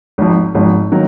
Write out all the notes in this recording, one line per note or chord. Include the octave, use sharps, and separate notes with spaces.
G#1 G#2 F3
G#1 G#2 F3
D#3 F#3 A#3